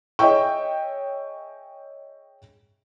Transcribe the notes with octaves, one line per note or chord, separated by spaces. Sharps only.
G#4 C#5 D#5 E5 G5 C#6